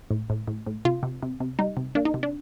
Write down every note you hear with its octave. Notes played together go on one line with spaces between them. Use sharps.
A2
A2
A2
A2
C3 F4
C3
C3
C3
G3 D#4
C3
A#3 D4
D#4
C3
D4